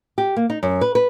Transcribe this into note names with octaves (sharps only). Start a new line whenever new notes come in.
G4
A#3
D#4
F#2
B4
B4